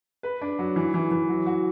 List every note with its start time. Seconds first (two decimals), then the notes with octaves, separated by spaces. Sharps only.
0.23 B4
0.41 D4
0.59 F#3
0.76 E3
0.94 E3
1.11 E3
1.29 F#3
1.46 F#4